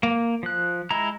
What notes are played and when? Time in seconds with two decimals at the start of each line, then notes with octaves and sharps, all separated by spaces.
0.03 A#3
0.43 F3 F#6
0.90 G#3 E4 A#5